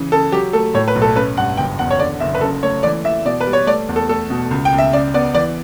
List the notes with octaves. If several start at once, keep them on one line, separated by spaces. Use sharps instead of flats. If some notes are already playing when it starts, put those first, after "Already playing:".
Already playing: C#3 E3
C#3 A4
F#3 G4
A3 A4
A2 C#5
B4
B1
A4
C#4 B4
G2 F#5
F#1 G5
E2 F#5
C#5
D3 D5
F#1 E5
B4
F#2 A4
A3 C#5
E3 D5
E3 E5
B2 D5
B4
G3
C#5
A3 D5
E2
A4
A3 A4
B2
C#2
G5
C#2
E5
C#3 D5
B3 D5
E3 D5